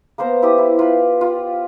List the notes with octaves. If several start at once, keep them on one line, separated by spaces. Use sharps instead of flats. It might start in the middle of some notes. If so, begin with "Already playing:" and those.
A#3 B3 C5 A#5
E4 G4 D#6
E4
F4 B4
F4